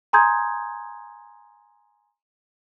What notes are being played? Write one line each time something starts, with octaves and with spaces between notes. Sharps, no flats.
G#5 A#5 C6 D#6 G6 G#6